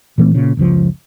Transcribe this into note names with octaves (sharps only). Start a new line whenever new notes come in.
A#2 E3 A3 C4
A#2 C#3
F#1 C#2 F3